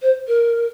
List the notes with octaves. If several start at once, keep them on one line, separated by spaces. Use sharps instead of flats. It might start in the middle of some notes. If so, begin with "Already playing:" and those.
C5
A#4